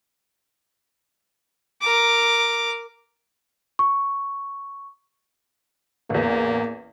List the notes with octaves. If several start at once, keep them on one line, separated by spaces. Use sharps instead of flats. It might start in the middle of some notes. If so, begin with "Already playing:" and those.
A#4 D6
C#6
A1 E2 A#3